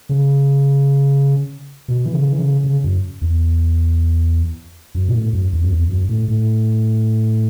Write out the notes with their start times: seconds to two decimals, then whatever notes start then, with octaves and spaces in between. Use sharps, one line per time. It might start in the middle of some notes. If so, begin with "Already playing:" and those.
0.09 C#3
1.88 B2
2.06 E3
2.13 C#3
2.32 E3
2.39 C#3
2.64 C#3
2.84 F#2
3.21 E2
4.95 F#2
5.08 B2
5.14 A2
5.33 F#2
5.52 E2
5.63 F#2
5.72 E2
5.90 F#2
6.09 A2
6.28 A2